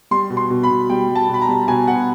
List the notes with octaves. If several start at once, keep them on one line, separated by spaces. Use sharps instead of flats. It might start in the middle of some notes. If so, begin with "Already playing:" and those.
G3 C6
B2
C6
B2
B5
B2
G3 G5
G3
A5
B2
B5
A#5
G3
B2 G#5
B2 F#5